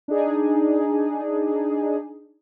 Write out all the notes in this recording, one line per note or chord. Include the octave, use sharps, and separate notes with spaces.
D4 D#4 G#4